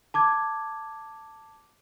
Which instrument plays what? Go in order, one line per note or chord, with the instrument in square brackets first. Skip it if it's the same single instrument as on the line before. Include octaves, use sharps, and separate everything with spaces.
[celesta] A5 D6 G#6